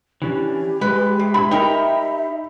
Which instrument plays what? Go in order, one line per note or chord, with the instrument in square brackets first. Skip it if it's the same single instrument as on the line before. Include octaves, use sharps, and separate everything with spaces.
[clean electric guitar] E3 C#4 D4 [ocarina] G4
[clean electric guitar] G#3 [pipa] B4
[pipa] C3
[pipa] E4 F#4 [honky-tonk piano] B5
[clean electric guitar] D#4 G4 A#5 [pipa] A#4 G5 [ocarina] E5